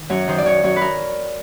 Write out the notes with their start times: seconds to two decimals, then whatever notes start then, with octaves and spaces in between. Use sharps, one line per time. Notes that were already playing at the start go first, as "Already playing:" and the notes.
Already playing: D#3
0.10 F#2 C#5
0.28 D#3 C5
0.38 D5
0.45 D#3 C#5
0.63 F#2 C#5
0.76 B4
0.81 A#4